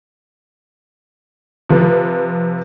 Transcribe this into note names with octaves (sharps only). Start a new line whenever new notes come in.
C3 F3 B4